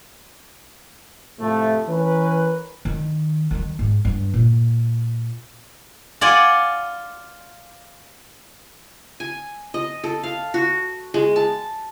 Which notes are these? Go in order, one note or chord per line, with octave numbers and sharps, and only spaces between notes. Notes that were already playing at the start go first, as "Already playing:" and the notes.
A2 C3 F3 A3
E3 C#4 A#4 B4
D#3
D#3 G3
G#2
G2
A#2
F4 D5 F#5 G#5
G#5
D#5
A4
F5
F#4
G#3
A5